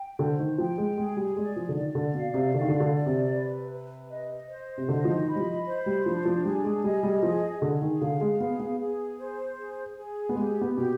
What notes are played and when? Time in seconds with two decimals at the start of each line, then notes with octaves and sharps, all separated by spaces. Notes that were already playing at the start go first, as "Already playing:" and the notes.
Already playing: G5
0.19 D3 C5
0.39 D#3
0.58 F3 G5
0.78 G#3
0.97 G#3 G#4
1.17 G3
1.36 G#3 D5
1.56 F3
1.69 D3
1.75 D#3 D5
1.95 D3
2.14 B2 F5
2.34 C3
2.54 D3 D5
2.61 D#3
2.68 D3
2.80 D3
2.93 D5
3.06 C3
3.32 B4
3.72 B4
4.11 D#5
4.50 C5
4.78 C3
4.88 D3 D#5
5.05 F3
5.14 D#3
5.28 B5
5.36 G3
5.40 F3
5.66 C5
5.86 G3
6.05 F3 D4
6.25 F3
6.45 G3 G#4
6.64 G#3
6.84 G3 D#5
7.03 G3
7.23 F3 G#4
7.62 D3 G#4
7.82 D#3
8.01 D3 F5
8.21 G#3
8.41 B3 G#4
8.60 B3
8.79 G#4
9.18 C5
9.58 G#4
9.97 G#4
10.29 B3
10.36 G#3 G4
10.62 B3
10.75 B2 G4